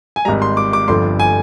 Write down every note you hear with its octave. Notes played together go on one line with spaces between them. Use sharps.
G#5
G#1 G#2 G3 A#5
C6
D6
D6
G1 G2 D3 F3 C6
G#5